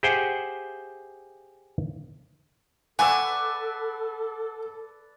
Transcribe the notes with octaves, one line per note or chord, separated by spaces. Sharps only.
G4 G#4 C5 E5 F#5 G5
A4 B4 D5 F5 F#5 G#5 C#6 E6